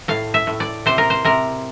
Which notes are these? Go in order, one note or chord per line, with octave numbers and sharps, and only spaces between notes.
A2 F5
E5
A2
D5
C3 C5
A#4
C5
C3 A#4